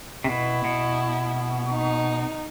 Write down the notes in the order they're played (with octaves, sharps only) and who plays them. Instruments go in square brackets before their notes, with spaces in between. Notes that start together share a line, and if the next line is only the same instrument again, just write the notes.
[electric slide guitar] C3
[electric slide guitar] B2 [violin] E4
[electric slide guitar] B2
[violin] D#4